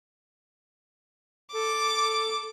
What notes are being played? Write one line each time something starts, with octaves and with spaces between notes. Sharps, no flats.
A4 D6